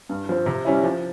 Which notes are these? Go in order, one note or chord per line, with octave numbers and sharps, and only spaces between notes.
G2
F3 C4
C3
G3 C#4 E4
F3